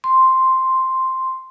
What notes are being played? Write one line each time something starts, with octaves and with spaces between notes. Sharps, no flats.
C6